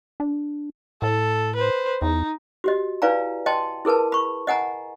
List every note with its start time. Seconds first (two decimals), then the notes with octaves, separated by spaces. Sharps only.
0.20 D4
1.02 A2 A4
1.55 B4 C5
2.02 E2 D#4
2.64 F#4 G4 D#5
3.02 E4 B4 D5 F5 G#5 A#5
3.46 D#5 G5 A5 C6
3.85 E4 G#4 A#4 B4 A5
4.12 B5 C#6
4.47 D#5 F#5 G#5 A#5